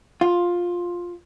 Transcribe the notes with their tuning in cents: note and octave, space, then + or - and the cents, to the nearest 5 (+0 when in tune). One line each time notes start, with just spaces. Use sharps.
F4 +10